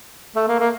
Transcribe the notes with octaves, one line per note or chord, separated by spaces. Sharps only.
A3
A#3
A#3